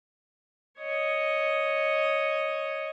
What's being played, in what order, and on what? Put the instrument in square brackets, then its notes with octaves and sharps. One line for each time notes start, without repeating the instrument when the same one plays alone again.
[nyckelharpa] C#5 D#5